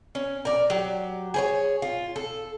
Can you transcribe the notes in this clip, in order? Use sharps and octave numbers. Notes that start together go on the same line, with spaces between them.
C#4
A#4 D5
F#3 G4
G#4 C5 C#5
F4
A4